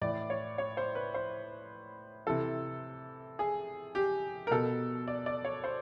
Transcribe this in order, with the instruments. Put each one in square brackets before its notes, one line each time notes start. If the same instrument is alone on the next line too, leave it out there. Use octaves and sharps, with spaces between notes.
[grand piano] A2 E3 D5
C#5
C#5
C5
B4
C5
C3 E3 A4
G#4
G4
A#4
B2 A4
D5
D5
C#5
C5